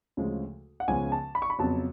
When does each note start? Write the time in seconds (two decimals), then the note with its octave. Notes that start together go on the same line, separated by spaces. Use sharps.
0.17 D2 C#3 F3 G#3
0.80 F#5
0.88 C#2 C#3 F3 G#3 B3 G#5
1.12 A5
1.35 B5
1.42 C#6
1.50 B5
1.59 F2 C#3 F#3 B3 A5